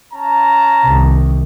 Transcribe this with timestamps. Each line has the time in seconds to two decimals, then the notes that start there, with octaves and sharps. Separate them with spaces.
0.14 C#4 A5 A#5
0.85 C2 D#3